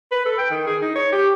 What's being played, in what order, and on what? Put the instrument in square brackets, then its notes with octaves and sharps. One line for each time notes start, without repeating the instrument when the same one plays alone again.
[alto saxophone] B4
A4
G5
D#3
G#4
D#4
C#5
G4